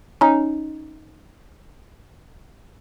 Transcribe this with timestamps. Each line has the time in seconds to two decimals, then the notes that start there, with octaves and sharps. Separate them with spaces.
0.21 C#4 D#4